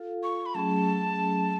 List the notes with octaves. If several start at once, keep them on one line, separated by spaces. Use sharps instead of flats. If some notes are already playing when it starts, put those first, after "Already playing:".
Already playing: F4 A4 F5
C#6
B5
F#3 A3 C#4 G#4 A5